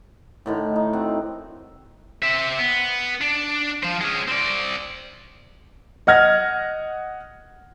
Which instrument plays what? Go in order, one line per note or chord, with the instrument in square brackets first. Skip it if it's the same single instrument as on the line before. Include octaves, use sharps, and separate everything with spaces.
[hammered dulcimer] A2 D3 D#3
D#4
C4 F#4
[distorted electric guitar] C4 E5
B3
D4
F3 C5
G#3 C#4
C4 D5
[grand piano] D#5 F#5 F6 G#6 A#6